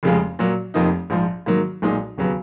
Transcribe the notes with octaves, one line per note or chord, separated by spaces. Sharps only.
F1 F2 C#3 F3 G#3
A#2 F#3 A#3
F1 F2 F3 A#3 D#4
A#1 G#2 F3
G#2 D#3 F#3 A#3
B1 A#2 G#3 D#4
D#2 C#3 F#3 B3